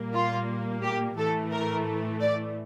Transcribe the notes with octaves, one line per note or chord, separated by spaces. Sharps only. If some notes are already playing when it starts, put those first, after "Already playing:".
Already playing: A#2 G3 A#3
F4
G4
A2 E3 A3 A4
A#4
D5